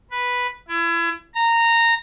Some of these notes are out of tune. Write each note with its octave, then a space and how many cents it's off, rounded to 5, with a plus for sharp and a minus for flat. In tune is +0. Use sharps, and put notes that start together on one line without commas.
B4 -5
E4 +35
A#5 -15